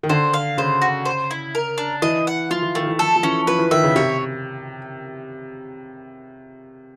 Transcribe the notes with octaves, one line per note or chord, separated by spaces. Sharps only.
D#3
D3 C5
F5
C#3 C5
F#4
C5
E4
A#4
D4
E3 D#5
F#5
F3 F4
E3
D#3 A3
E3
F3 A4
F3
E3 C#4
F3 B4
E3
D#3 E5
C#3
C3 C#5